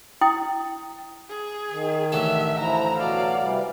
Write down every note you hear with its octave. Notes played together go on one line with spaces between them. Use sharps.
E4 G5 D#6
G#4
D#3
A1 D3 A4 E5
F3 E4 A#5
B2 F#3 D5 F5
C3 E3 G3